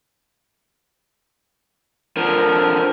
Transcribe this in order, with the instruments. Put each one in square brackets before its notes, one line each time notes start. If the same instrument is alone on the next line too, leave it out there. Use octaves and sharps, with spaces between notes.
[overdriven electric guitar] D3 F3 [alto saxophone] A#4